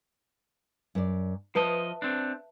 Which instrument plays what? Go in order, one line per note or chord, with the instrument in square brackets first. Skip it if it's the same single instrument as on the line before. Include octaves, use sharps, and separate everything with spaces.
[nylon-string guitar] F#2 D5
[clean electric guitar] F3 D#5 [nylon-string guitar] B4 E5 A5
[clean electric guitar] C4 D4